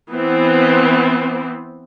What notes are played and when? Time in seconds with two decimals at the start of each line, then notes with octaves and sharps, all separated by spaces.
0.12 E3 B3 C4